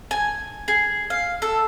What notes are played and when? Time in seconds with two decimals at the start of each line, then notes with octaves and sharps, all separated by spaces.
0.11 G#5
0.68 G#4
1.10 F5
1.42 A4